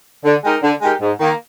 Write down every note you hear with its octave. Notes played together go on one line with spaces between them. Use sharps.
D3
G#3 D#4 G4 A#4
D3
G#3 D#4 G4 A#4
G#2
D#3 A#3